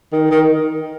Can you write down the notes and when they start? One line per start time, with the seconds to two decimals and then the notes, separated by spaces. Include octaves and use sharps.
0.12 D#3
0.31 D#3